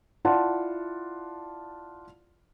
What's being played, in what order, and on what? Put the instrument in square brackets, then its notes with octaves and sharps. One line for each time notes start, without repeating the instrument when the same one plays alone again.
[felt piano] E4 F4 D5 F#5 A5